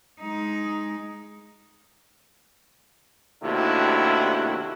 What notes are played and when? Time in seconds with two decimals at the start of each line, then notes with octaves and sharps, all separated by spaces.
0.21 G#3 D#4
3.43 D#2 C3 A3 D4 E4 F#4